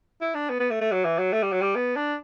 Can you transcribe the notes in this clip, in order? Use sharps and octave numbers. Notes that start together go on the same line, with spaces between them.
E4
D4
B3
B3
A3
A3
F#3
E3
F#3
A3
G3
F#3
G3
B3
D4